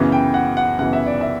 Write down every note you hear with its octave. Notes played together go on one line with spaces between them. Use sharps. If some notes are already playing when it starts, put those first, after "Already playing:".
Already playing: F#2 C#3 E3 B3
G5
F#5
F#5
F#2 C#3 E3 B3 F#5
E5
D5
E5